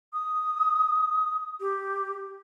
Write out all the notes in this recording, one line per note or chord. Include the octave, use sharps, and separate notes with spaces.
D#6
G4